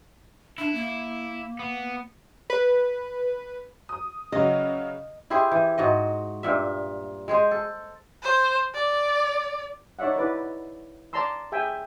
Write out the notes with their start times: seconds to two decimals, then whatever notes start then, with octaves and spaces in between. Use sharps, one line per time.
0.58 D4 E4
0.75 A#3
1.59 B3
2.50 B4
3.89 D#6
4.32 C#3 F#3 D#5
5.30 E4 G4 G#4 C5
5.52 E3
5.78 G#2 F#4 D#5
6.43 G2 A#2 E5
7.28 G#3 G#4 C5
7.51 A4
8.23 C5
8.74 D5
9.99 D#4 C#5 D5 E5 F#5
10.16 E4 B4 D5
11.13 D5 A5 A#5 C6 E6
11.52 G#4 E5 G5 G#5